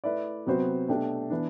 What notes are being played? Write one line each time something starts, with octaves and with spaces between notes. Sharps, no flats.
A3 E4 B4 D5
C3 F#3 B3 F#4 C5
B2 A3 D4 G4
E3 B3 D4